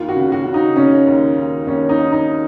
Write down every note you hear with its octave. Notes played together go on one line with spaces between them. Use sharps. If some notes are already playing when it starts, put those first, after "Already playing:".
Already playing: D#2 F4
F#4
C#3
F#4
C#3
D#4
C#3 C#4
D#2
D#2
D#2 C#4
D#4
D#2
D#4